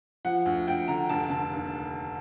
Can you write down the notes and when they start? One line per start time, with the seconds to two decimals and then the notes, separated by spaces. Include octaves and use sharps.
0.25 F3 F#5
0.46 D2
0.67 D2 G5
0.88 D3 A#5
1.09 F1 A5
1.30 D3 A5
1.52 D#2